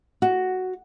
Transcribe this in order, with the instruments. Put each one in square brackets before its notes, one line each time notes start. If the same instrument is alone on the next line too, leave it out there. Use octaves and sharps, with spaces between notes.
[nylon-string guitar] F#4